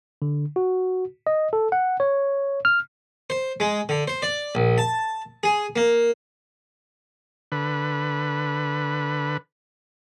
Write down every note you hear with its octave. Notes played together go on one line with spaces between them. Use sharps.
D3
F#4
D#5
A4
F#5
C#5
F6
C5
G#3
D3
C5
D5
A#1
A5
G#4
A#3
D3 B4